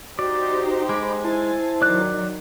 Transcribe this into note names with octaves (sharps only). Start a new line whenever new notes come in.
D#4 F#4 G4 C5 D5
G#3 B5 D6
E4 C5 G#5 A5
D#3 F#3 D5 F#6